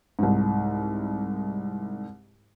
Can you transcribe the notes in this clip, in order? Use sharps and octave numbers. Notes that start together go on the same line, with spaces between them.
C2 G#2